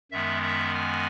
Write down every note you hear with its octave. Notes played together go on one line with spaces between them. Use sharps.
F#2 D#3 G#3 B3 E5
E5
G#5